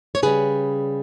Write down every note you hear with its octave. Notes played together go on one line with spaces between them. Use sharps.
C#5
C#3 G3 C#4 G#4 B4